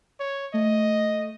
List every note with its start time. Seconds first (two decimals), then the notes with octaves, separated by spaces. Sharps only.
0.20 C#5
0.54 A3 D#5